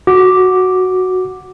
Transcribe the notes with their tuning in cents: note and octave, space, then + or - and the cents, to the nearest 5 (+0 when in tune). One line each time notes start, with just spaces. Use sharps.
F#4 +0 D6 +0